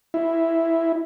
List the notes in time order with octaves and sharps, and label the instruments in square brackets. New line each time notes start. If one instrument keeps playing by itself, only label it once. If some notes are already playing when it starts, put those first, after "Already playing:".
[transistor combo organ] E4